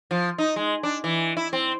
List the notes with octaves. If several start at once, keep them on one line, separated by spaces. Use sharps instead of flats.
F3
D#4
G#3
D4
E3
E4
C4